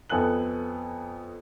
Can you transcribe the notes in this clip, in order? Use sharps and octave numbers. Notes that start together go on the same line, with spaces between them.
F2 B3 A4 G#5 F#6 F#7